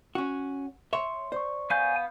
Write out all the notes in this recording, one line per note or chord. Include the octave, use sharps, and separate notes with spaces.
C#4 F#4
C#5 E5 C6
C5 D5 C#6
B3 F5 G#5 G6